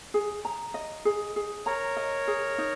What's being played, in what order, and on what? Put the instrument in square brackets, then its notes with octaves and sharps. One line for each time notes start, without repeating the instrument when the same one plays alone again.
[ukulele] G#4
A#5
D#5
G#4
G#4
[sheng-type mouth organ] A#4 C#5 [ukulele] A#5
[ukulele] D#5
G#4
D#4